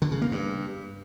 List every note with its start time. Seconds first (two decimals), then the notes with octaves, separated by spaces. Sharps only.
0.02 D3
0.12 C#3
0.22 A#3
0.32 G2